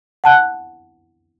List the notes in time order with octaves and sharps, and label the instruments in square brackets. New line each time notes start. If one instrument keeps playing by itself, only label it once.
[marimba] F#5 A5 F#6